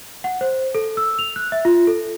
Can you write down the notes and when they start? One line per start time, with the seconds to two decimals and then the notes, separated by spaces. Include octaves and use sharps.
0.24 F#5
0.41 C5
0.75 A4
0.97 E6
1.19 F7
1.36 F#6
1.52 E5
1.65 F4
1.87 A4